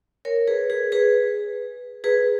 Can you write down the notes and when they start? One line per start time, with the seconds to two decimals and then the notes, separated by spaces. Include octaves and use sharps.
0.25 A#4 C#5
0.48 G#4 B4
0.70 G#4 B4
0.92 G#4 B4
2.04 G#4 B4